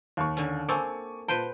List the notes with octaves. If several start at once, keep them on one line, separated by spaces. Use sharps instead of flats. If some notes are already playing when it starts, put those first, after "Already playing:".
D#2 C#6
D3 C#4
A#3 C4 A4 G#5 C#6 D6
A#2 B4 C5 G5 A5